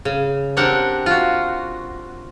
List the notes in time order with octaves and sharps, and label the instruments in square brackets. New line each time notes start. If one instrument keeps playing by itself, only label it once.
[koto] C#3
C4 D4 G4 A#4 F#5
F4 F#4